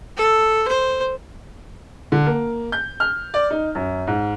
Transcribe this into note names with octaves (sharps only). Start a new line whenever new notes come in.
A4
C5
D3
A#3
G6
F6
D5
D#4
F#2
G#2